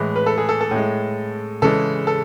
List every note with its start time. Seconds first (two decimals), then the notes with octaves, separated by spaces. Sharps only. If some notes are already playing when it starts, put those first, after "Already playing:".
Already playing: A2 E3 G#3
0.16 B4
0.26 A4
0.38 G#4
0.49 A4
0.61 A4
0.71 A2 G#3
1.62 C#3 E3 G#3 A4
2.07 A4